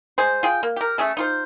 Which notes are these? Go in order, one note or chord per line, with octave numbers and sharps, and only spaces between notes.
G#3 G#4 C5
F4 G#4 G5
A#3
G4 A#4
A3 C#4 G#4 A4
D#4 F4 C5